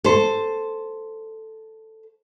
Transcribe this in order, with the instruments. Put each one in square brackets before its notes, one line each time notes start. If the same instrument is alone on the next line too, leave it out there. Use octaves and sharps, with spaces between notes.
[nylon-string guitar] A4 C5